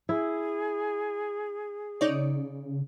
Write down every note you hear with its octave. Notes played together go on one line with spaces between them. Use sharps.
E4 G#4
C#3 D#4 C#5 D5